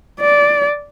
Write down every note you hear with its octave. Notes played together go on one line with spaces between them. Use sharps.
D5